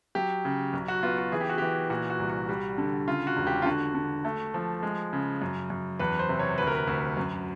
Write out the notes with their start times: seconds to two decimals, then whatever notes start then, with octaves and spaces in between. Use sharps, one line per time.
0.15 F#3 G4
0.45 C#3
0.73 B1
0.88 F#4
1.03 B3 F4
1.18 F#4
1.32 E3 G#4
1.41 G4
1.49 F#4
1.58 E3 G4
1.90 A#2 F#4
2.10 F#4
2.20 C2
2.29 F#4
2.49 G3
2.78 D3
3.08 C#3 F4
3.27 F#4
3.37 E1
3.47 G4
3.62 F4
3.65 D3 F#4
3.95 D3
4.25 A3
4.54 F3
4.83 G#3
5.13 C#3
5.42 F#2
5.70 F#2
5.99 E2 B4
6.19 C5
6.29 C3
6.39 C#5
6.58 D2 B4
6.67 A#4
6.75 B4
6.87 D2
7.17 F#2